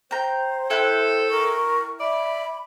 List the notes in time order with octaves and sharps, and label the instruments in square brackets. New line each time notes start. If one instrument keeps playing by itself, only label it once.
[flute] C5 [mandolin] G5 A#5
[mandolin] E4 G5 F#6 [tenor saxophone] A4
[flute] A#4 [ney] C#6
[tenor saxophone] D5 [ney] E5 [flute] B5